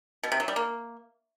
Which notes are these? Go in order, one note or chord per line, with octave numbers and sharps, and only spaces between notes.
B2
C3
F#3
G3
A#3